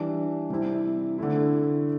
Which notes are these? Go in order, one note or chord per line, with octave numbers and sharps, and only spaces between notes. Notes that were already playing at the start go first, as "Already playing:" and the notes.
Already playing: E3 G3 D4
C3 G3 C4 E4
D3 A3 E4